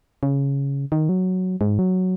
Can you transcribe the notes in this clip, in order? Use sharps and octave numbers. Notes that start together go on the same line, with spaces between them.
C#3
D#3
F#3
G#2
F#3